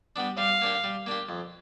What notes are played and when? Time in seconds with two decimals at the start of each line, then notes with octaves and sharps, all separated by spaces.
0.16 G3 B3 D4
0.38 G3 F5
0.61 A#3 D4 G4
0.84 G3
1.06 A#3 D4 G4
1.29 F2